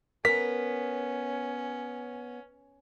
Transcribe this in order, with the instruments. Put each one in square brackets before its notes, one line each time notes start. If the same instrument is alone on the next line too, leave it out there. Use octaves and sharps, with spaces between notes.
[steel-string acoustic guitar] B3 [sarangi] C#4 [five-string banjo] A#4 [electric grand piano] B6